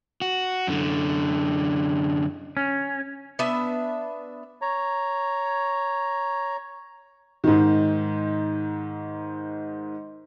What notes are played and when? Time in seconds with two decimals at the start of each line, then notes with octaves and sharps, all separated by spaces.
0.22 F#4
0.67 F#2 D3
2.57 C#4
3.39 B3 D4 E5
4.62 C#5 A#5
7.44 G#2 D#3